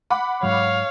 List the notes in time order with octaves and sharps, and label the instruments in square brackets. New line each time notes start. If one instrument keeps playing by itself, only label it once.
[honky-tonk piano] F#5 B5 D6
[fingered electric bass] G#2 F#3 [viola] C#5 F5